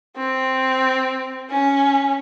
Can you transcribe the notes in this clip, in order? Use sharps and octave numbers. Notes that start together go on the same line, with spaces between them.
C4
C#4